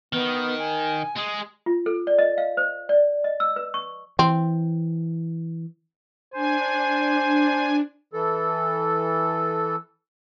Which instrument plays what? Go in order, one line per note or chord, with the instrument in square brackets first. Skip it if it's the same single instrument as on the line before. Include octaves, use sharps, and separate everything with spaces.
[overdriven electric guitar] D#3 [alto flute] B3
[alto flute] G#5
[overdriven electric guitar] G#3 G#4
[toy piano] F4
A4
D5
D#5
F5
C5
D5
D#5
E6
B4
C#6
[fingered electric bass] E3 [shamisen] C4
[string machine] D4 [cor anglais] C5 [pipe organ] G#5
[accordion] E3 A4